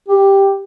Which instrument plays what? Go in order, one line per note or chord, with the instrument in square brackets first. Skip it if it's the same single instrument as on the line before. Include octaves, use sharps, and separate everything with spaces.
[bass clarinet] G4